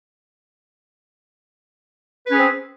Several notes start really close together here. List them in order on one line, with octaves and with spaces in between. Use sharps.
B4 C#4 G#4 C4